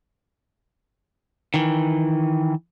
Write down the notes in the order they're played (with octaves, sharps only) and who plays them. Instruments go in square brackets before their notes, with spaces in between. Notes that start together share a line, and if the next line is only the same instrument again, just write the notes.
[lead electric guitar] D#3 E3